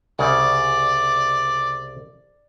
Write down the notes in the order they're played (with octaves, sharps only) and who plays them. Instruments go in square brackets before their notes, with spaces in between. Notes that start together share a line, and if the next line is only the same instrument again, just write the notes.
[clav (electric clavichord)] C2 C#3 C#5 [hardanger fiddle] D5